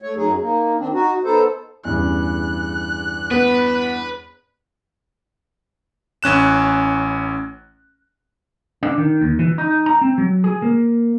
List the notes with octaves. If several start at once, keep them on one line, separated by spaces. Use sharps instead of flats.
A3 C#5
F#2 F#3 D#4 G#4
A#3 D#4
D#3 C4 D4
D#4 F#4
B3 D#4 A4 C5
E2 G2 C#3 F#6
B3 B4
A1 C#4 F#6 E7
D4
D#3
D#2
E3
D#4
A#5
C4
F#3
G#4
A#3